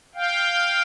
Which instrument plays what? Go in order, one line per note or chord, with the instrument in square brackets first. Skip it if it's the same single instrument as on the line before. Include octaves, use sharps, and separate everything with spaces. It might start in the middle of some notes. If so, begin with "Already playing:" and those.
[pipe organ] F5 G5